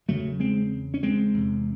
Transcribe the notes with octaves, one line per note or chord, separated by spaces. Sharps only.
E2 C#3 F#3 A3
G#3 C4
C#4
G#3 C4
E2 C3